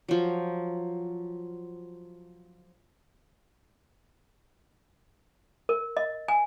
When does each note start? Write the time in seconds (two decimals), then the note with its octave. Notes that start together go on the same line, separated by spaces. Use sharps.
0.08 F3 F#3
5.69 A#4
5.97 D#5
6.28 G#5